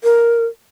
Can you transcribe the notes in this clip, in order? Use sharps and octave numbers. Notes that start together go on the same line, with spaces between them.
A#4